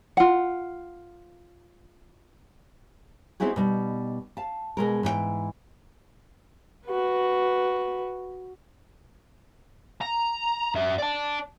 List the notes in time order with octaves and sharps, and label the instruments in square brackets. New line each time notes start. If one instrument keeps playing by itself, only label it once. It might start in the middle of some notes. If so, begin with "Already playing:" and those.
[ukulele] F4 F#5
[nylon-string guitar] B3 C4 D#4 E4 F#4 G#4
B2 G3 D#4
F5 A5
B2 G#3 A#4
G#2 E3 G#4 G5
[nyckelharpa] F#4 B4
[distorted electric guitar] A#5
F#2 E5
D5 A5